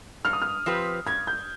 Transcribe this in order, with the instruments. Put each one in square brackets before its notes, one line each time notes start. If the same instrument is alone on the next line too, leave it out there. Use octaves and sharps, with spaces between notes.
[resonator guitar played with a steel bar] G2 [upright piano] F6
[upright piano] D#6
F6
[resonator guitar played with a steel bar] F3 C4 G4 B4
[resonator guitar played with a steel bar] G2 [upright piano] G#6
[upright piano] G6